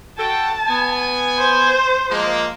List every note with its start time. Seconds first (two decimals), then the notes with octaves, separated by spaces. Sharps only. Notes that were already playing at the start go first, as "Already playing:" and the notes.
0.18 F#4 A4 G5 A5
0.68 B3 G#5
1.38 C5
2.10 F3 G#3 A#3